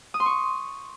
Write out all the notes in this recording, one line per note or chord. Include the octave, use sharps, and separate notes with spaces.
D#6
C6
C#6